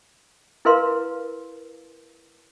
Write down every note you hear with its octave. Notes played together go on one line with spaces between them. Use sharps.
E4 A#4 B4 F5 C6